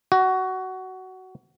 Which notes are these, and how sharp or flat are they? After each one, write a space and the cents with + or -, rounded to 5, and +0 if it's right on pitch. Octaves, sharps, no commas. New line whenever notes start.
F#4 +15